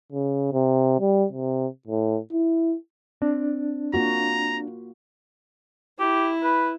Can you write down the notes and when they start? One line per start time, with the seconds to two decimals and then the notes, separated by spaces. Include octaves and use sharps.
0.12 C#3
0.53 C3
1.00 G3
1.32 C3
1.87 A2
2.33 E4
3.22 C4 D4
3.94 A#3 F4 F#4 A#5
5.99 E4 G4
6.43 B4